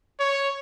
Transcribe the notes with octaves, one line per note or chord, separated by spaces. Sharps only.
C#5